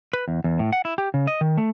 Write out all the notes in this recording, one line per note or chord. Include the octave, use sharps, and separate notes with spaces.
B4
E2
E2
A2
F#5
E4
G4
C#3
D#5
D#3
A3